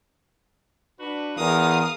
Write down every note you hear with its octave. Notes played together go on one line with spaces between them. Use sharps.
D4 F#4 B4
E2 A#4 F5 D#6